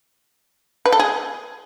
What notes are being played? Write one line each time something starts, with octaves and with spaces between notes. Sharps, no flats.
B4
A4
G#4